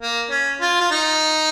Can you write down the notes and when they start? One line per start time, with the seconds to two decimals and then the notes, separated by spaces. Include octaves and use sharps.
0.01 A#3
0.30 C#4
0.61 F4
0.81 F4
0.91 D#4